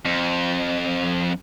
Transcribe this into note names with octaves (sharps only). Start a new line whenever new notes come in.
F2